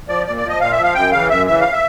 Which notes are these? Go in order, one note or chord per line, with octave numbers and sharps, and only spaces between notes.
F3 D5
A#2 D5
D5
F3 D#5
A#2 F5
E5
F3
F5
F#2 G5
C#3 E3 F5
F#2 E5
C#3 E3 E5
F5
E5